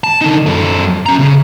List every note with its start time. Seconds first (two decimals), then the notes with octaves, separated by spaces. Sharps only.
0.04 A5
0.21 D3 D#4
0.46 F#2 A4
1.06 C#4 A#5
1.19 C#3 C#4